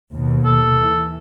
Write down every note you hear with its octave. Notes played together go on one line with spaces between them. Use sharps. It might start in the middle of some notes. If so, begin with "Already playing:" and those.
D#2 B2
A4
E3